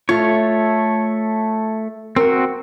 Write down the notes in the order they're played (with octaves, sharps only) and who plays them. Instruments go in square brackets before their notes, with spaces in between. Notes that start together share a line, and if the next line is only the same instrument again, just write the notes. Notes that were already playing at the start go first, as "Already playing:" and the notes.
[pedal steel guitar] A3 C#5 [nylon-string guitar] F4
[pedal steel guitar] C4 F#4 [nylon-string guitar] A#4